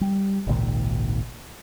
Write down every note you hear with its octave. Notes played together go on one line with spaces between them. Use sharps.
G3
G#1 C#2 A#2 D#3